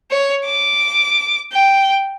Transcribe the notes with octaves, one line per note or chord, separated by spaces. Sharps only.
C#5
D6
G5